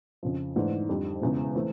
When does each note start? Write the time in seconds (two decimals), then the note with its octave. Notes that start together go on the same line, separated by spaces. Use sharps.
0.23 F2 C#3 F3
0.56 G#2 E3 A3 D4
0.89 F2 D3 G3
1.22 E1 E2 C#3 E3
1.55 E3 A3 C4